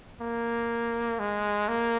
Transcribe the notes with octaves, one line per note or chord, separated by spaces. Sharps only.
A#3
G#3
A#3